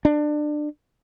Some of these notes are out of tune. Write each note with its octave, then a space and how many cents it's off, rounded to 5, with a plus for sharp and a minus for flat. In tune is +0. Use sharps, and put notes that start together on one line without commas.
D4 +25